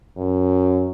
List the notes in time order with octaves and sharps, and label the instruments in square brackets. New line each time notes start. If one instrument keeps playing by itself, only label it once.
[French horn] F#2